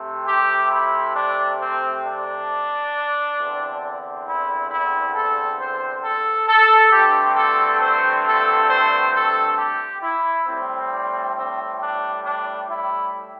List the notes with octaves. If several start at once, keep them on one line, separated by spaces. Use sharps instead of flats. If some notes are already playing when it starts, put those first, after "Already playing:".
Already playing: C3 A3 C4
G4
E4
D4
C4
D4
E2 D3 C4
E4
E4
A4
C5
A4
A4
G2 D3 A3 C4 G4
A4
C5
A4
C5
A4
G4
E4
A2 G3 C4
D4
C4
D4
D4
E4